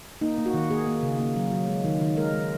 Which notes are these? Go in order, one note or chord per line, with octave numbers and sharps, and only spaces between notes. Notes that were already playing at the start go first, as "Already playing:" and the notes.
A#3 D#4
A#3
F#4
D#3
A#3 G#4
A#3
C#3
A#3
F#3
F#3
G#3
D#3
D#3
G#3 A#4
G#3